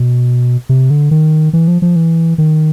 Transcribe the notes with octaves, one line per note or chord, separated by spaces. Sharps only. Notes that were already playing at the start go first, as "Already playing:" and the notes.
Already playing: B2
C3
D3
D#3
E3
F3
F3
E3
D#3